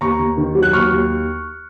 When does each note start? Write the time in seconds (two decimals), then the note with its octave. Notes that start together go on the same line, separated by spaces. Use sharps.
0.01 D#2 A#5 C#6
0.19 D#2
0.37 D#3
0.55 F#3
0.63 F#6
0.73 D#2 C#6 F6
0.91 D#2